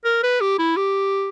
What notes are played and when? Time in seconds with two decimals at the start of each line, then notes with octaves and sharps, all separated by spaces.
0.04 A#4
0.23 B4
0.41 G4
0.59 E4
0.76 G4